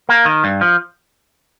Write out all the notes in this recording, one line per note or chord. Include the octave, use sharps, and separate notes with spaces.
A#3
D#3
G2
F3